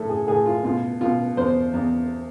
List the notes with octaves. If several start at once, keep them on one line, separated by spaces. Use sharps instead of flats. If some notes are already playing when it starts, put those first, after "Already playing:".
Already playing: A2 A4
G#4
A2 G#4
F4
B2 F4
B2 F4
E2 C5
E2